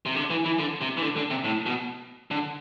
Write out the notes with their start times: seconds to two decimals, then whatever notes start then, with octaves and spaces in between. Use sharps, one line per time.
0.06 C3
0.16 D3
0.30 E3
0.45 E3
0.59 D3
0.81 C3
0.97 E3
1.02 D3
1.17 D3
1.30 C3
1.44 A2
1.66 B2
2.31 D3